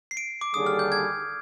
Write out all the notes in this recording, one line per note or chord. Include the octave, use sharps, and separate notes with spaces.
C7
D7
D6
D#2 D3 G3 D4 G#4 D#6
F6
G6
G#6